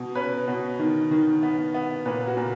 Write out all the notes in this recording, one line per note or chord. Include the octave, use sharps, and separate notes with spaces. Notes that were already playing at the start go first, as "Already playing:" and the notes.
Already playing: B2
C#4 B4
B2
D#3
D#3
B3
B3
A#2 B4
F#4
A#2